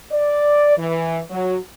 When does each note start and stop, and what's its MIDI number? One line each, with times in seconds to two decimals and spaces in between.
0.11 0.75 74
0.77 1.20 52
1.30 1.57 54